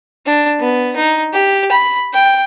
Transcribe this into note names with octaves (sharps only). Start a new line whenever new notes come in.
D4
B3
D#4
G4
B5
G5